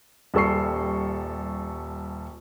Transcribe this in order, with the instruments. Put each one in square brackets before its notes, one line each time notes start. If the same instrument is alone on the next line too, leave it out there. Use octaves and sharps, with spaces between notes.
[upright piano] D#1 G3 A4 C#6 C7